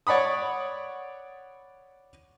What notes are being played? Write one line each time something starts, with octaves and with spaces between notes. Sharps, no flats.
C#5 D5 F#5 B5 D#6